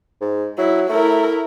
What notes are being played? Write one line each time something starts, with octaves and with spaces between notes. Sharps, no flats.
G#2
F#3 E4
A3 E4 A#4